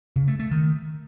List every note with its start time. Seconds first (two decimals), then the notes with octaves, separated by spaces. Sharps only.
0.16 C#3
0.28 A3
0.39 A3
0.51 D#3